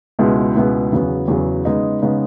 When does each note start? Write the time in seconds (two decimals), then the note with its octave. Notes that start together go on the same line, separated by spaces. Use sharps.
0.19 C#2 B2 G#3 B3 E4
0.55 C#2 B2 G#3 B3 E4
0.92 E2 C#3 F#3 B3
1.28 E2 C#3 F#3 B3
1.65 C#3 G#3 B3 D#4
2.02 C#3 G#3 B3 D#4